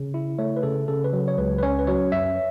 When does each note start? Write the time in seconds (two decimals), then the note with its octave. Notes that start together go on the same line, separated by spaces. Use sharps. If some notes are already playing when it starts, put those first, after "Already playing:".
Already playing: C#3
0.14 E4
0.39 A3 C#5
0.56 B4
0.63 C#3 A4
0.88 C#3 A4
1.04 B4
1.13 F#3
1.28 C#5
1.38 C#2 B4
1.58 B4
1.63 C#4 C#5
1.79 B4
1.87 F#3 C#5
2.12 F#2 E5